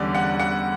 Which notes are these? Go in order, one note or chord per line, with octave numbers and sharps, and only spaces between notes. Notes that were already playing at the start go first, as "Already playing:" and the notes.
Already playing: E2 D3 G3 C#4 D5 F#5
F#5
F#5